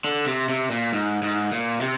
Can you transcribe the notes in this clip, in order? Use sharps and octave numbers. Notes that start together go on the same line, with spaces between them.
D3
C3
C3
A#2
G#2
G#2
A#2
C3